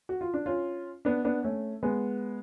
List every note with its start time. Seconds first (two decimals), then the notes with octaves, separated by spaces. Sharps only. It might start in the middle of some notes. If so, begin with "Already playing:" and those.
0.09 F#4
0.21 F4
0.34 D4
0.46 C#4 F4
1.05 B3 D4
1.25 B3 D4
1.43 A3 C#4
1.83 G#3 B3